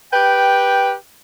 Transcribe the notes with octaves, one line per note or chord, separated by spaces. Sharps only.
G4 B4 G5